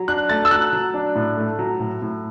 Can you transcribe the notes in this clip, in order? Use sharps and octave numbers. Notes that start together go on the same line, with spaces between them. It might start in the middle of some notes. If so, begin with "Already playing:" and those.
Already playing: F#3
D4 F#6
A3 A6
E6
F#3 F#6
F#3
D4
A2
A3
F#3
A2
A2